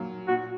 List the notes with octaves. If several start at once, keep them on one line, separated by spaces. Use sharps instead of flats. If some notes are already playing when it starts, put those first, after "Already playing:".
Already playing: A#2 F#3 A#3
A#2 F#4